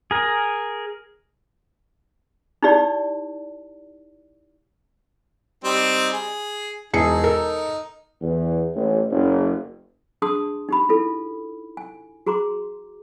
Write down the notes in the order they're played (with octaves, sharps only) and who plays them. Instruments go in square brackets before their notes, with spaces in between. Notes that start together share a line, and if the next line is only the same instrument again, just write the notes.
[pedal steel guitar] G#4 A#4
[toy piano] D#4 E4 G4 D5
[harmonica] G3 C4 D#4
G#4
[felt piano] E1 G#4 C#7 [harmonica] D#4
[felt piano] A4 A#4
[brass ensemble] E2
A1
F#1
[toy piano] D4 G#4 A5 C6 D#6
D#4 G4 B5
E4 F4 A4
G#5
F#4 G#4 A#5 C6 D6